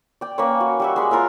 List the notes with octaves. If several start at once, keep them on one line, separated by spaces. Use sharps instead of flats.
D5 G5
A#3 C#4 B4 C#5
F#4
G3 F#4 E5
G#3 B5
F4 A#4 C#5 E5